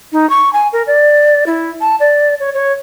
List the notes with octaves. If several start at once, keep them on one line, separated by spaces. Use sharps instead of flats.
D#4
C#6
G#5
A#4
D5
E4
A5
D5
C#5
C#5